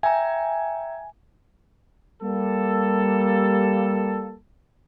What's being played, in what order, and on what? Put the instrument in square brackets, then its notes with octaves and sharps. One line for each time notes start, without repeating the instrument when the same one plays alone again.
[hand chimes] E5 G5 A#5 [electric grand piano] G#5
[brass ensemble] G3 A#3 A4